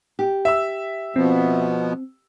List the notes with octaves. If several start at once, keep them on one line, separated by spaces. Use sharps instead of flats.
G4
E5 E6
B2 F3 B3 C4